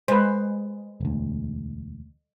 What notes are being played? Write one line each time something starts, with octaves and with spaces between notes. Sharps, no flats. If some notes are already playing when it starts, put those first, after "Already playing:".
G#3 B4 C5
E1 D2